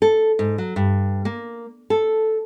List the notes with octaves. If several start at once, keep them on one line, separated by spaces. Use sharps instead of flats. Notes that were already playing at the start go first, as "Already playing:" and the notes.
A4
G#2
F#3
G2
A#3
A4